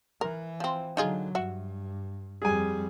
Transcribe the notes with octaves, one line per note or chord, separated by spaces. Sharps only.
E3 A#4
F3 C4
D3 F#3 D#4 F4 G#4
G2 F#4 E5
F2 G3 G#4 G#5